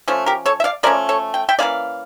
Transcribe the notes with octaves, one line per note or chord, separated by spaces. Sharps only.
F3 A3 C#4
G4 A#4
A4 C#5
E5
D5 F5
F3 A3 C#4 A#4 D5
A4 C#5
G5
E5 G5
E3 A#3 C#4 D5 F5